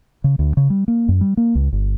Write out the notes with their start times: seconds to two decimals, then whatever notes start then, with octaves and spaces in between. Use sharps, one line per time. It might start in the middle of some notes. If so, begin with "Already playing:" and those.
0.24 C#3
0.39 D2
0.57 C#3
0.70 G3
0.88 A#3
1.08 F#2
1.21 G3
1.37 A#3
1.55 C#2
1.73 G1